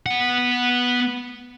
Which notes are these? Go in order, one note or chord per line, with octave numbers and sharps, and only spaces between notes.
B3 F#5